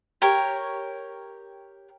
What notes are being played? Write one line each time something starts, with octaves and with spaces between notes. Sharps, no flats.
G4 A#4 C#5